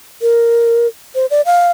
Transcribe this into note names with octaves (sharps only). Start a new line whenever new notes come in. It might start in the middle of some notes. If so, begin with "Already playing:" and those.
A#4
C5
D5
F5